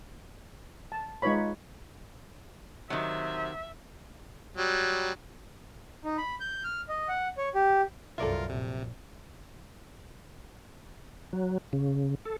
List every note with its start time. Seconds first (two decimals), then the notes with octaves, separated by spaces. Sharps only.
0.92 A5
1.22 G#3 D#4 F4 B4 C#5 B5
2.90 C3 D#3 F#3 E5
4.57 F#3 G3
6.04 D#4
6.18 B5
6.40 G6
6.64 F6
6.89 D#5
7.08 F#5
7.37 C#5
7.55 G4
8.18 C2 F#2 F4 A4 A#4 D5 E5
8.50 A#1 C3
11.33 F#3
11.73 C#3
12.25 A4